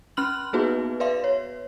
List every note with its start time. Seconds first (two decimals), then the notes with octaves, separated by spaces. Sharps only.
0.17 C#4 B5 C6 F6 F#6 F#7
0.53 A#3 B3 D#4 F#4 G#4 B4
1.00 B4 D5 E5 F5 C6
1.24 C#5